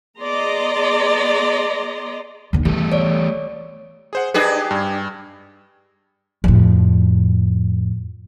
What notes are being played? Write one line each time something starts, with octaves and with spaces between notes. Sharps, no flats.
B3 G#4 D5 D#5 A#5 C6
D#2 D3
E3 G3 A3 B3
C#5 D5
G#4 C5 F#5
D4 G4 G#4 B4 D#5
G2
F2 A2